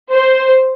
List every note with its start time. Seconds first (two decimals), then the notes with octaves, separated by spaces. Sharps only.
0.12 C5